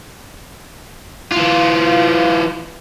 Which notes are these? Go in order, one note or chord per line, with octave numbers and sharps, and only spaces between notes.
E3 F4